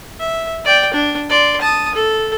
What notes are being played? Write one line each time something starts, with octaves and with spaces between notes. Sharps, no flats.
E5
D5 G5
D4
D5 C6
A5 D#6
A4